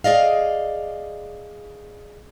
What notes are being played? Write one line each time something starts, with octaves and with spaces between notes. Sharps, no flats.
G#4 D5 D#5 F5